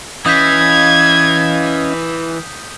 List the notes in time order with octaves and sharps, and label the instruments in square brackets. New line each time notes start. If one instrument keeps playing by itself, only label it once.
[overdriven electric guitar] E3 [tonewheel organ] C#4 D#5 F5 [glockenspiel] D#6 G6 B6 [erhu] G#6